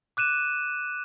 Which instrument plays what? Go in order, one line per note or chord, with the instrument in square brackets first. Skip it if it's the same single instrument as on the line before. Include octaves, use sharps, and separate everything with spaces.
[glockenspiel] D6 F#6 D#7 E7